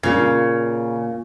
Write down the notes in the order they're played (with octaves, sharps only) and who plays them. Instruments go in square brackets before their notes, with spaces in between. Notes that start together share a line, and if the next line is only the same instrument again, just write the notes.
[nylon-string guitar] A#2 A#3 [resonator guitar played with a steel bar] C#3